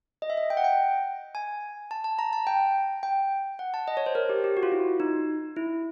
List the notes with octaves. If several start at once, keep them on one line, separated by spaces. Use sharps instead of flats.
D#5
E5
D#5
G5
F#5
G5
G#5
A5
A5
A#5
A5
G5
G5
F#5
A5
D#5
C#5
C5
A#4
G4
G4
F#4
F4
E4
D#4
E4